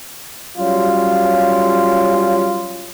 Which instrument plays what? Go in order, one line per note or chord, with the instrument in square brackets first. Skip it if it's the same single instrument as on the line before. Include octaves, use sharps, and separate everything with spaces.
[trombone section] F#3 G3 C#4 F4